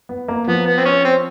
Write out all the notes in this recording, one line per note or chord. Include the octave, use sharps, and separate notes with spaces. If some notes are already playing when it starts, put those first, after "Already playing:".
B3
A#3
F3 B3
B3
C4
C#4
C4